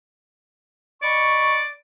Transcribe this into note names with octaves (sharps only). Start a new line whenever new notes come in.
D5 D#5 B5 C#6